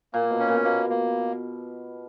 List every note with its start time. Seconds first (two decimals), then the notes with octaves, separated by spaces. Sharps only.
0.14 A#2 A#3
0.31 B2
0.40 C#4
0.48 A#2
0.64 B2 A#3
0.90 A#3